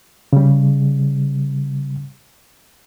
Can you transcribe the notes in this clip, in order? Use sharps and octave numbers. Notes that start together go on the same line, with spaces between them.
C#3 G3